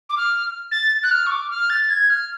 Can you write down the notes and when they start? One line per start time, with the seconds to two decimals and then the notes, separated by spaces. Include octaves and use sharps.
0.09 D6
0.17 F6
0.71 A6
1.03 F#6
1.11 F6
1.26 C#6
1.31 D6
1.50 F6
1.69 A6
1.90 G#6
2.10 F6